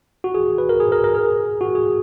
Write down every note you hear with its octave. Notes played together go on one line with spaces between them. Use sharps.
F#4
G#4
B4
A#4
G#4
A#4
A#4
G#4
F#4
G#4